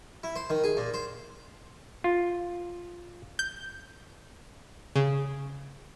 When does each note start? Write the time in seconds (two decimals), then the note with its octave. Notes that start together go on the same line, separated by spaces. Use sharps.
0.23 E4
0.36 C5
0.50 D#3
0.64 G#4
0.77 A#2
0.94 C5
2.04 F4
3.39 G6
4.96 C#3